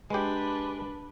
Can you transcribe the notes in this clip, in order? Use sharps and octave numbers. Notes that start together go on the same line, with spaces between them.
G#3 D4 G4 B4